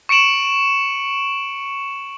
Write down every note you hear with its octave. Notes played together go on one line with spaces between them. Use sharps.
C#6 C#7 D7 E7 F#7